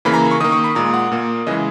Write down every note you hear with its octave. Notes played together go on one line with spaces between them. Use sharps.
C#3 E3 A#3 B5
A#5
C#6
D#3 A#3 D#6
C#6
B5
A#2 G#3 A#5
F#5
A#2 A#3
C#3 E3 G#3 D#5